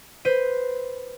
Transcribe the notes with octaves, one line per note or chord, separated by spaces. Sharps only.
B4 C5 D#7